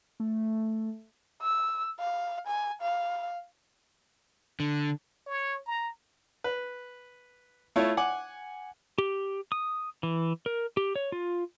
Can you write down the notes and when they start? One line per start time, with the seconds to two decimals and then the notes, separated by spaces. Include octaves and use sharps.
0.20 A3
1.42 E6
2.00 F5
2.47 G#5
2.82 F5
4.60 D3
5.27 C#5
5.66 A#5
6.44 B4
7.76 A3 E4 F4 C#5
7.97 F#5 G#5 D6
8.98 G4
9.52 D#6
10.03 E3
10.46 A#4
10.77 G4
10.96 C#5
11.12 F4